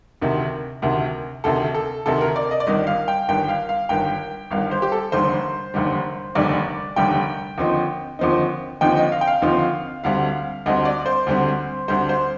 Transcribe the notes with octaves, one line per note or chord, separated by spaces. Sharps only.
D2 C3 D#3
D2 C3 D#3
D2 C3 D#3 A4
A4
D2 C3 D#3 A4
A#4
D5
D#5
D5
G1 G2 D#3 D#5
F5
G5
G1 G2 D#3 G5
F5
F5
G1 G2 D#3 G5
G1 G2 D#3 F5
C5
G4
A4
F1 D#2 D3 G3 C5
F1 D#2 D3 G3
F1 D#2 D3 G3 D5
F1 D#2 D3 G3 G5
D#2 D3 F3 C4 D#4
D#2 D3 F3 C4 D#4
D#2 D3 F3 C4 D#4 G5
D#5
F5
G5
F5
D#2 D3 F3 C4 D#4
D2 D3 G3 C4 F5
D2 D3 G3 C4 D#5
D5
C5
D2 D3 G3 C4
D2 D3 G3 C4 C5
C5